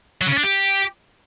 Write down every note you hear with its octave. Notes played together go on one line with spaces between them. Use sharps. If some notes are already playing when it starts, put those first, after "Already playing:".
F#3
C#3
C#4
D4
G4